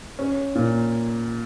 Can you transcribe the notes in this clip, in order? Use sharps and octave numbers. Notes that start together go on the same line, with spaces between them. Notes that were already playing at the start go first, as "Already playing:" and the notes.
C#4
A#2